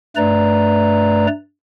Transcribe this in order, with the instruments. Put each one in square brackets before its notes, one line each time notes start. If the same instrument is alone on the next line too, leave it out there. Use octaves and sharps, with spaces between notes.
[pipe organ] G2 A3 B4 D5 A#5